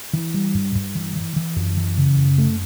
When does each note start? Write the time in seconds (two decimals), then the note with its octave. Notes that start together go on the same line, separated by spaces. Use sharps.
0.13 E3
0.34 G3
0.54 G2
0.75 G2
0.95 E3
1.16 E3
1.36 E3
1.56 F#2
1.77 E3
1.97 C#3
2.17 F#2
2.38 A3